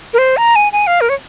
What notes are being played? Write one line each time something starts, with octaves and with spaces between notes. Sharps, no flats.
A#4
C5
A#5
G#5
G#5
F5
A#4
C#5